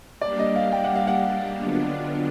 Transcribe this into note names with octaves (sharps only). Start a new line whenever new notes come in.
G3 A#3 D4 G4 D5
D#5
F5
G5
F#5
F5
F#5
D3 F#3 B3 D4 F4